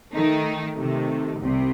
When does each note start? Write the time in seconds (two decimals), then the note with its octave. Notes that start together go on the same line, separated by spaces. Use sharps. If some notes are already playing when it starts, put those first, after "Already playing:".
0.13 D#3 A3 D#4
0.78 C3 D#3 A3
1.41 C2 C3